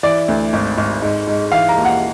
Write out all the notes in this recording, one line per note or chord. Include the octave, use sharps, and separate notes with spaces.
E3 D5
D2
G#1
G#1
G#2
G#2
E3 F5
A#5
D#2
F#5